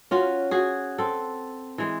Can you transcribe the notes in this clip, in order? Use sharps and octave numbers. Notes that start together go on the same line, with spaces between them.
C#4 F4 F#4
F#4 G#4
C4 A4
E3 G#3